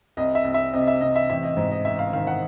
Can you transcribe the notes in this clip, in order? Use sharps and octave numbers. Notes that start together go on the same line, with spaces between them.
C2 D#5
E5
C2
E5
C3 D#5
E5
C3 D#5
E5
A1 E5
D#5
G#2 D#5
D#5
A1 E5
F5
D#3 F5
F#5